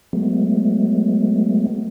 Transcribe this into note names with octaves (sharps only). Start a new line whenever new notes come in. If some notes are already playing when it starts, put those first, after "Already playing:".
F#3 G#3 A3 B3